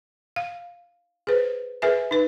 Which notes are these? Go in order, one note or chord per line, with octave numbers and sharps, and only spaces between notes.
F5
G#4 B4 C5
G#4 A#4 B4 E5 G#5
D#4 B4